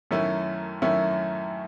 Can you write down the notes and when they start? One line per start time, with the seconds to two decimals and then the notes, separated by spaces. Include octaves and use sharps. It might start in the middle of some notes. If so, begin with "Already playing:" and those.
0.11 F#2 D#3 A3 C#4 E4
0.82 F#2 D#3 A3 C#4 E4